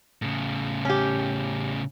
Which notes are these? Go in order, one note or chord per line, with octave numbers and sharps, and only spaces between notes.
A2 C#3
C#4 G4